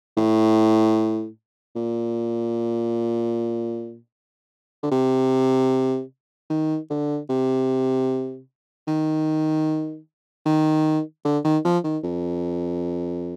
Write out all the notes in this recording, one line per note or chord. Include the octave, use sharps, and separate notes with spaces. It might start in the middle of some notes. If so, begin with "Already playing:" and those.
A2
A#2
D3
C3
D#3
D3
C3
D#3
D#3
D3
D#3
F3
D#3
F2